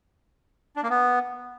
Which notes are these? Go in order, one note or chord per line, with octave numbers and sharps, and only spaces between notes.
D4
A#3
B3